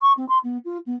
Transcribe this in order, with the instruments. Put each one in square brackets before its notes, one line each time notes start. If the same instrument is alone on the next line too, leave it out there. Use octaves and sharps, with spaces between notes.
[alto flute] C#6
C4
C6
B3
F4
B3